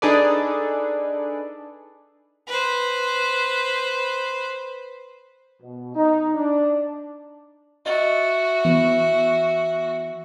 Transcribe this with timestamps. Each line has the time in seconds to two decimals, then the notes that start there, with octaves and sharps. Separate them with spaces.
0.02 D4 D#4 G#4 A4 B4 D5
2.48 B4 C5
5.62 B2
5.95 D#4
6.34 D4
7.86 F#4 D#5 E5 A6
8.65 E3 B3